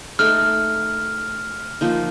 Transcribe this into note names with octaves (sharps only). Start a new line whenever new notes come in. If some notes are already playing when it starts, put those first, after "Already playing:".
A3 D#4 A4 D#5 F6
F3 A#3 D#4